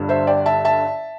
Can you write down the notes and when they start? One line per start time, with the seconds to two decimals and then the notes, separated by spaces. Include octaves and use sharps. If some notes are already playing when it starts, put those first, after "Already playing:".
Already playing: G1 G2 D3 G3
0.09 C5 E5
0.27 D5 G5
0.46 E5 A5
0.65 E5 A5